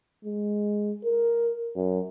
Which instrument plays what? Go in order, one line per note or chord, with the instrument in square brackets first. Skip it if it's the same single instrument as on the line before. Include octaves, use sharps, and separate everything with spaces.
[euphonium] G#3
A#4
F#2